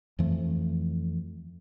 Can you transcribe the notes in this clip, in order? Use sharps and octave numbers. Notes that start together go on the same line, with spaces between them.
F2 E3 F3 A3